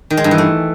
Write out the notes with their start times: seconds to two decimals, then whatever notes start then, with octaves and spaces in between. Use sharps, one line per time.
0.10 D#3
0.17 G#3
0.24 G2
0.31 E3
0.38 A3